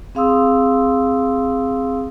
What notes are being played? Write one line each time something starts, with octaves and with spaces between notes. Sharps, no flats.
C4 G#4 F5 C6 D#6 E6